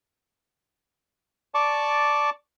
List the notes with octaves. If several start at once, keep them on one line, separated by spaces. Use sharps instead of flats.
D5 A5 C#6 D6